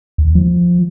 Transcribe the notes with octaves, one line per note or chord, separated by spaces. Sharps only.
D#2
F3